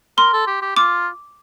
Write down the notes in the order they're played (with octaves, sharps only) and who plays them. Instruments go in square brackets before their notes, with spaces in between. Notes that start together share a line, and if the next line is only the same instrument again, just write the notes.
[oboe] A#4 [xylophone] C6
[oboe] A4
G4
G4
[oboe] F4 [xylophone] D6